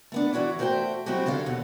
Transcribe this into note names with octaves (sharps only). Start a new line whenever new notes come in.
A3 B3 D4
E3 E4 F#4 C#5 D5
A3 F#4 C5 E5 G5
F#3 G#3 C4 E4 F#4 G4
D3 A4 C#5 F5
D#2 B2 F#5